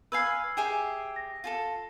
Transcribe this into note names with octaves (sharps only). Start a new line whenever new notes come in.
B4 F5 G#5 E6 G#6 C7
G4 G#4 E5
A#6
F4 G#4 A4